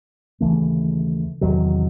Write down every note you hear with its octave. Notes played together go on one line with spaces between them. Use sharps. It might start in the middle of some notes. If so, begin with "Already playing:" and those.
D#2 C#3 E3 A3
E2 C3 D#3 F#3